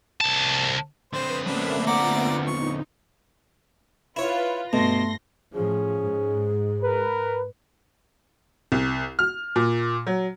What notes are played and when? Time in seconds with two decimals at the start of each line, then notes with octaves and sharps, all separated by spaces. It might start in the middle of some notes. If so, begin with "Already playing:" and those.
0.21 C2 A5
1.13 D3 C4 B4 C5 D#6
1.46 F#3 A3 A#3 C#4 D4 B4 E5
1.86 D2 B3 F4 D5 F#5 A#5 D6
2.47 D#4 C#6
4.16 E4 F4 B4 C#5
4.73 G2 B2 A3 C6 A#6
5.54 A2 F3 C#4 G#4
6.02 G#2
6.82 A#4 B4
8.72 C2
9.19 F6
9.56 A#2
10.07 F#3